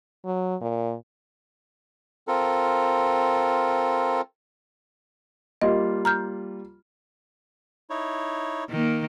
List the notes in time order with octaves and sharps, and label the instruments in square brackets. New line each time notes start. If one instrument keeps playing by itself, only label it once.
[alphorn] F#3
A#2
[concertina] C4 F4 A4 A#4
[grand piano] G3 A#3 F4 [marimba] D#5
[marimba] A#5 F6 G6
[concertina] D#4 E4 C#5
[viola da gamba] D#3 A#3